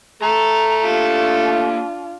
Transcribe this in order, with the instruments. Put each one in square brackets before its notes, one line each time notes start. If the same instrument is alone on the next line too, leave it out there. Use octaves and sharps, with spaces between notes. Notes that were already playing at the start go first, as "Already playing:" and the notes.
[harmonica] A3 A4 [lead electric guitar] A#5
[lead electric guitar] A#3 G4 [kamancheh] D4 F4